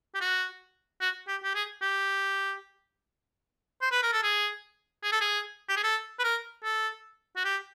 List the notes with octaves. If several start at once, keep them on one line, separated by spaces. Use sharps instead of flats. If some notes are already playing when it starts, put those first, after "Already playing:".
G4
F#4
F#4
G4
G4
G#4
G4
C5
B4
A#4
A4
G#4
G#4
A4
G#4
G4
G#4
A4
B4
A#4
A4
F#4
G4